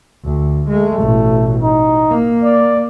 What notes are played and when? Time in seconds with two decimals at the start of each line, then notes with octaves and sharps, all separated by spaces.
0.24 D2
0.69 G#3 A3
1.00 A1 B2
1.63 D#4
2.10 A#3
2.43 D5